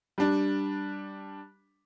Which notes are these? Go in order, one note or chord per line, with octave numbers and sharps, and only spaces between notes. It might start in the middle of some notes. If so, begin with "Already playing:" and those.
G3 D4